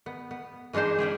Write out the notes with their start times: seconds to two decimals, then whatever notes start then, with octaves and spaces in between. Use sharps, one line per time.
0.06 B3
0.31 B3
0.73 E3 G#3 D4 D#4 C5
0.99 F3 E4 G4 G#4